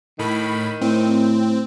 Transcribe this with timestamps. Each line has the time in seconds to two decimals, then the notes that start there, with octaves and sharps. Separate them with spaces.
0.19 A2 D#3 B5
0.81 A2 C4